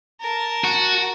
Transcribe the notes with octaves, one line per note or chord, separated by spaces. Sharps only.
A#4 A5
F#4